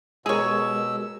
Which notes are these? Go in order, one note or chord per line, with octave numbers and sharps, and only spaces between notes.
B2 G#3 G4 G#4 A#4 C#5 E6